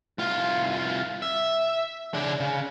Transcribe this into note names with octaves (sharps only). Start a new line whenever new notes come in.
C2 F4
E5
C#3 D4
C#3